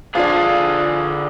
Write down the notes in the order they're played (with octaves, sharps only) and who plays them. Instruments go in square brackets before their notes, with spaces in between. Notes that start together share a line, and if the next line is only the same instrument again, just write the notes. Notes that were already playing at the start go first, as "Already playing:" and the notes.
[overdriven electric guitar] D3 G#4 [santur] F3 D4 [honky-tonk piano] F4 [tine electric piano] F5